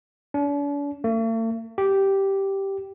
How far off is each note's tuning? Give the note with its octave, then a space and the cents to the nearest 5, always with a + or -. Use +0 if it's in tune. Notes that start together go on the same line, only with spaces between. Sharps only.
D4 -45
A3 +45
G4 -5